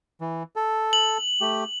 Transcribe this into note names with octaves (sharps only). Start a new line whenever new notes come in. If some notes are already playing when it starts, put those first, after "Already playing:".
E3
A4
F#7
A3 G4